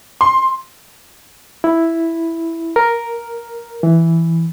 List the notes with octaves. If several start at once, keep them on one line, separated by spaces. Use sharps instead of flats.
C6
E4
A#4
E3